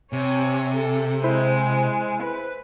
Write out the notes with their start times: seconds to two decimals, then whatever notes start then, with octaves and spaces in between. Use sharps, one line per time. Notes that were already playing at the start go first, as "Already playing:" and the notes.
0.13 C3 C#5 G#5
0.74 A4
1.24 G#3 E4 C5
2.22 B4